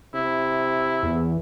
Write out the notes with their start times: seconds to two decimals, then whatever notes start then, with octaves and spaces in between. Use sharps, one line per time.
0.15 C3 E4
1.03 E2